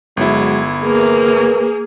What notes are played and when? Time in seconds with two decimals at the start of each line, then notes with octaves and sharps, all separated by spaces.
0.17 G1 F#3 G#3 E4
0.82 E2 A#3 G#4 A#4 B4